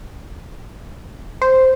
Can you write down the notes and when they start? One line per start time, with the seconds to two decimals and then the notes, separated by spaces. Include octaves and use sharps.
1.42 C5